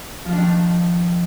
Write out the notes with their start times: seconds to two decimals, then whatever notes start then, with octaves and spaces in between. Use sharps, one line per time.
0.25 F3
0.29 F4
0.33 D4
0.37 D#3